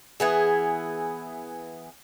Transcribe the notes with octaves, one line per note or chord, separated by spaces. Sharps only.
E3 B3 G#4